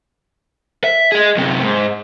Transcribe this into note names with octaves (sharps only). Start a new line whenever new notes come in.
E5
G#4 D#5
F#2 C3
G#2